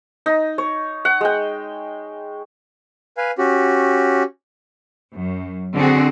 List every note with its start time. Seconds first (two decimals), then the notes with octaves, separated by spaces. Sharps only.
0.26 D#4
0.58 C#5
1.05 F#5
1.21 G#3 G5
3.17 B4 F5 G#5
3.38 C#4 F#4 G4
5.15 F#2
5.74 D3 C4 F#4 G#4